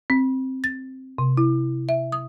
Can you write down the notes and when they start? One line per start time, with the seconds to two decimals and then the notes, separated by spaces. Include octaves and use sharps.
0.10 C4
0.64 A6
1.18 C3
1.37 E4
1.89 E5
2.12 D#6